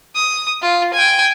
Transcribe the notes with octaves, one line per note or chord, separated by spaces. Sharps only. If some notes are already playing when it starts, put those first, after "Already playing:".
D#6
F4
G5 G#5